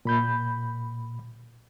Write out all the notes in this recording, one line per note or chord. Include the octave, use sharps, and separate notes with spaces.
A#2 B5 G6